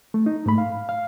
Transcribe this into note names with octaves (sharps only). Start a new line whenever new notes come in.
A3
D#4
G#2 A3 B5
F5
F5